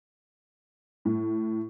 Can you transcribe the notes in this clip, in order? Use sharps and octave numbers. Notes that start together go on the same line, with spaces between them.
A2